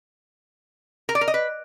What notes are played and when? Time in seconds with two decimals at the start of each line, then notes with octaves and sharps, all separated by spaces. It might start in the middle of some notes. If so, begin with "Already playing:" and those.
1.09 A#4
1.15 D5
1.21 A#4
1.28 D#5
1.34 B4